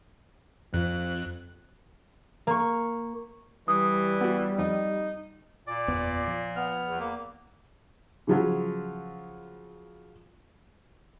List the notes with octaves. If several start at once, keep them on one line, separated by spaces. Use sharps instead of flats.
F2 F3 F#6
A#3 C#6
E3 G3 D#6
B3 F#4
F2 D#4
A#2 D5
F#1 E2 B3
F3
B3 F6
E2
A#3
C#3 F3 F#3